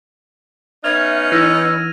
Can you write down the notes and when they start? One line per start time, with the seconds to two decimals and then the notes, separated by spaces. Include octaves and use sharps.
0.84 B3 C#4 D#4 E5 F6 G#6 F7
1.32 E3 E6 A#6 D#7